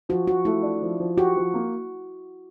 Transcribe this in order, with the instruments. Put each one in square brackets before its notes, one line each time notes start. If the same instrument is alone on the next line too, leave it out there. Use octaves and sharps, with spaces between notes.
[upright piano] F3 [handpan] F#4
[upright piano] F3 [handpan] F#4
[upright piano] A3 [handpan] E4
[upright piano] D4
F3
F3
[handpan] F#4 [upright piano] G4
[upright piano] F3
A#3